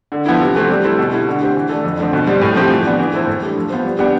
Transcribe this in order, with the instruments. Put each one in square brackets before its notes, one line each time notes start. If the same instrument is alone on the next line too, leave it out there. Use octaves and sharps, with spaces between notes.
[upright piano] D3
F3 B3 E4
C3
E3 A3 C4
G3
C4 E4 A4
B2
A3 E4 G4
D3
A3 C4 G4
E3
A3 D4 A4
F2
D3 F3 C4
B2
G3 C4
A2
F3 C4 G4
E3
B3 D4
E3
A3 E4 A4 C5
A2
G3 D4 A4
F3
B3 F4 C5
G3
B3 D4 G4